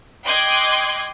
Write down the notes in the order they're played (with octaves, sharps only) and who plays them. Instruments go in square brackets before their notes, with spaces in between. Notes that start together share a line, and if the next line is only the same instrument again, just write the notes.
[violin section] D#5 G5 C6 D6 F#6 G#6